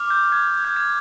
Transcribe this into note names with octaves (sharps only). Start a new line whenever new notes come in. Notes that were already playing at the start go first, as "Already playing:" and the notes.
Already playing: D6 F6
G6
G#6
G6
G#6